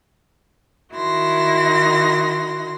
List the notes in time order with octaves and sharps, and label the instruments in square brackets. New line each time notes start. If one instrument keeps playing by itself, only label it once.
[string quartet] D#3 E4 F#4 C6 A#6